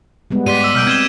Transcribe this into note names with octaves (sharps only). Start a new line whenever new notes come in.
G3 G#3 B3
G#2 G4 D5 C6 B6 D#7
D6 E6
B1 F6 G6 D7
C4 G#6 E7 G7